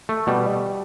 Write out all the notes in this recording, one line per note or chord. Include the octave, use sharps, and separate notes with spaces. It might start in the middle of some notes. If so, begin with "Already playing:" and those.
A3
B2 G3